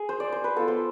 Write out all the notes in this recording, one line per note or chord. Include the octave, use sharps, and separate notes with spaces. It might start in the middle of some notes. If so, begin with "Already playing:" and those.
Already playing: G#4
C5
D5
C5
B4
B3 F4 A4
C5